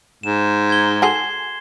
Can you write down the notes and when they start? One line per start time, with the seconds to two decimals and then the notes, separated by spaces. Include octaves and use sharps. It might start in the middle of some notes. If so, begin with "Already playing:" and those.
0.23 G#2 E7
0.70 G#6 G7
1.02 F#4 G#4 A4 C6 C7 G7